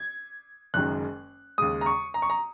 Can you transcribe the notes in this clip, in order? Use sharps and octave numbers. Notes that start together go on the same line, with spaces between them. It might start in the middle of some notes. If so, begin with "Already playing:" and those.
Already playing: G#6
F#1 F#2 D#3 G#3 F#6
D#2 C#3 G#3 D#6
A#5
C#6
A#5
C#6
A#5